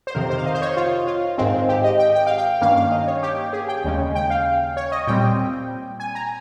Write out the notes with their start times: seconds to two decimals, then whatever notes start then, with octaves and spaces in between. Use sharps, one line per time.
0.07 C5
0.15 F2 C3 D#3 A#4
0.30 C5
0.38 F5
0.46 D#5
0.54 C5
0.62 C#5
0.77 F4
1.07 F4
1.38 G#2 D#3 G#3 C4
1.69 G4
1.84 D#5
1.99 G5
2.15 G5
2.27 F5
2.38 G5
2.61 G2 D#3 A#3 C#4 F5
2.76 F5
2.91 D#5
3.07 C#5
3.23 G4
3.53 G#4
3.68 G5
3.85 D#2 C#3 G#3 C#4
4.15 G5
4.30 F5
4.77 C#5
4.92 D#5
5.07 A#2 G3 C4 G5
6.00 G#5
6.15 A#5